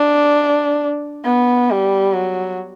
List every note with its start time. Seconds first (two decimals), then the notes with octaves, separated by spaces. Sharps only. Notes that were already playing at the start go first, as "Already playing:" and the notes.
Already playing: D4
1.25 B3
1.70 G3
2.15 F#3